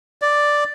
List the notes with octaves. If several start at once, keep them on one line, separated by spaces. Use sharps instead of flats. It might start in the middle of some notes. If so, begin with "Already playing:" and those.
D5